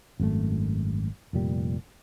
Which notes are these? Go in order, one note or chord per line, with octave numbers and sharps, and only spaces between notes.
G#1 F#2 D#3 A3
F1 A#2 G3